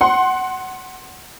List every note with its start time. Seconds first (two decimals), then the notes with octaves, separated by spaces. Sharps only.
0.01 F#5 C6